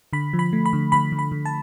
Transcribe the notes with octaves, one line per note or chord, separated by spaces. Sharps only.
D3 B5
F3
B5
A3
B5
D3
D3 B5
D3
B5
D3
A5